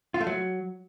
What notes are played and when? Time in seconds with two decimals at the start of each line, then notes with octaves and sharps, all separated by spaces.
0.14 F4
0.21 A3
0.27 F#3